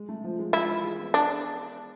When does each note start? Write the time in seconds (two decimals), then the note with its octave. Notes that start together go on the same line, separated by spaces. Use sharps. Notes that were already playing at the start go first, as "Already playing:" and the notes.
Already playing: G#3
0.09 A3
0.24 F3
0.39 G#3
0.53 E4 F4
0.69 E3
0.84 G#4
0.99 B3
1.14 D4 G#4